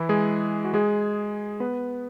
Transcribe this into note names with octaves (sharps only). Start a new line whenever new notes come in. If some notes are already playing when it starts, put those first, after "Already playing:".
Already playing: E3 E4
G#3 G#4
F#4
G#3 G#4
B3 B4